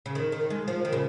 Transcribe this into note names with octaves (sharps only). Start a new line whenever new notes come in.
C#3
D#3
D#3
G#3
F3
D#3
C#3